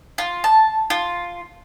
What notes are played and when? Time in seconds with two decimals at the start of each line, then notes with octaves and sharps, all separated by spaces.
0.18 F4
0.44 A5
0.90 F4